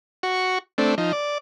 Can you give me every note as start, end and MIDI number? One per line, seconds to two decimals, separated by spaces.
0.23 0.58 66
0.23 0.58 85
0.78 0.95 57
0.78 0.95 60
0.78 0.95 62
0.98 1.12 53
0.98 1.12 63
1.13 1.38 74